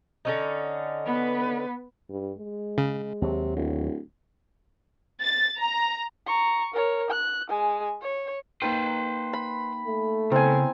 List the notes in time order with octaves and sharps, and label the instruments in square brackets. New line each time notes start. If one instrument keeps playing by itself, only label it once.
[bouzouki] D3 C#4 D#4
[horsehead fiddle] B3 B4
[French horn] G2
G#3
[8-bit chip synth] C#3
[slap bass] D#2 F#3 [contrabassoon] C3
[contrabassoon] D1
[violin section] A6
A#5
[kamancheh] A#5 C#6
A#4 C#5
F#6
G#3 G#5
C#5
[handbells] A#3 D#4 G5 [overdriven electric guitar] B4 C5
[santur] B5
[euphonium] A3
[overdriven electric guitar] C#3 [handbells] B3 E4 A#5 [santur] C4 G#5